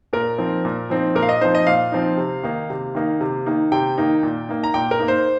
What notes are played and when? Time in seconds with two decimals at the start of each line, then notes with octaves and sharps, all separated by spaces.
0.13 A#2 A#4
0.38 F3 C4 D#4
0.65 A#2
0.90 F3 C4 D#4
1.15 A#2 A#4
1.22 F5
1.29 D#5
1.41 F3 C4 D#4 C5
1.55 D#5
1.67 A#2 F5
1.92 F3 C4 D#4
2.18 C3
2.43 D#3 A#3 D#4
2.70 C3
2.95 D#3 A#3 D#4
3.21 C3
3.46 D#3 A#3 D#4
3.72 C3 G5
3.98 D#3 A#3 D#4
4.23 A#2
4.49 A#3 D#4
4.64 A#5
4.74 A#2 G5
4.91 A#4
4.99 A#3 D#4
5.08 C5